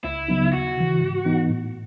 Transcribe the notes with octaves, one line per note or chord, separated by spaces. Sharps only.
C#2 E4
C#3 F#3 B3 D#4
D#2 F#4
C#3 E3
G#2
E3 B3 D#4
A2